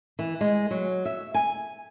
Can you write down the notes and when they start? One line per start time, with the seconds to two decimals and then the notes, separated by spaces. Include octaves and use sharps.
0.19 E3
0.41 G#3
0.71 F#3
1.05 E5
1.34 G#5